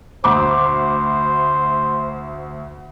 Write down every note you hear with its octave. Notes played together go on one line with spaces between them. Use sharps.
D2 C5 B5 D6